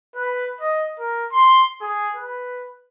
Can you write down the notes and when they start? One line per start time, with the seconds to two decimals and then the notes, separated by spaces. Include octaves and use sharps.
0.15 B4
0.60 D#5
0.99 A#4
1.32 C6
1.81 G#4
2.16 B4